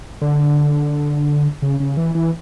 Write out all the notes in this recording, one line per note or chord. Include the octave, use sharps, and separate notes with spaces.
D3
C#3
C#3
E3
E3